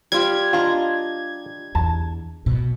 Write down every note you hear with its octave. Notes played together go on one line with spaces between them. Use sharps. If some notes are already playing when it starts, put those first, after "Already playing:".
G3 F4 G#6
D4 F4 D#5 A#5
E2 A5
B2